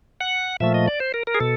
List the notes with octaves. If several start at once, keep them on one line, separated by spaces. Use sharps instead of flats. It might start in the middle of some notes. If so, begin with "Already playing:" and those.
F#5
A#2 F3 A3 E5
D#5
D5
C5
A#4
A#4
G#4
B2 A4